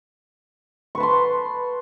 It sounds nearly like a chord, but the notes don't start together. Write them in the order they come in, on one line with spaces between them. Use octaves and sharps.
C#6 B4 A5 C6